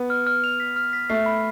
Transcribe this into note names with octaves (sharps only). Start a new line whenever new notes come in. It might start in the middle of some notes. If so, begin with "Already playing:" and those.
Already playing: B3
F6
F6
F7
B6
F6
B6
A3 C7
B5